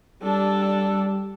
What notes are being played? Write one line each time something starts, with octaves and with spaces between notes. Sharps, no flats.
G3 D4 A4